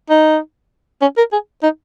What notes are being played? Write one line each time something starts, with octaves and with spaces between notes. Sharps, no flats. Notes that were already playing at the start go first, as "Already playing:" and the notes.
D#4
C#4
A#4
G#4
D#4